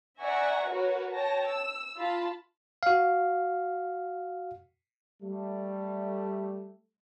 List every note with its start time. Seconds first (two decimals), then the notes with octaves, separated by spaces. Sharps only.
0.21 D5 E5 F#5 G#5 A#5 C#6
0.69 F#4 A#4 B4 C#5
1.11 C#5 G5 A5 A#6
1.47 E6
1.98 F4 A5 B5
2.83 F#4 F5
5.22 G3 A3